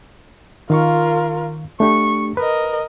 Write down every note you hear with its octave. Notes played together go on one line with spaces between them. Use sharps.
D#3 F4 A#4 F5 C#6
A3 D4 G4 C#6
A#4 B4 D#5